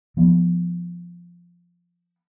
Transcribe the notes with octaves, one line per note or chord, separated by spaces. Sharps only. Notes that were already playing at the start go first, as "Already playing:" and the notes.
F3 B3